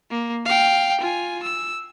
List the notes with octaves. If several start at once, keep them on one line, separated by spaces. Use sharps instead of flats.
A#3
F5 G5
F4 G#5
E6